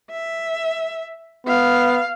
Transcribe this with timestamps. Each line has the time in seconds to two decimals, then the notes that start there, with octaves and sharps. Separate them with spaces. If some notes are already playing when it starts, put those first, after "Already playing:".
0.11 E5
1.47 B3 F5